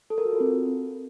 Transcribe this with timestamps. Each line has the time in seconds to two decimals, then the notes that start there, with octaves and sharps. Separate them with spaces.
0.10 A4
0.18 A#4
0.25 F#4
0.33 F4
0.40 C4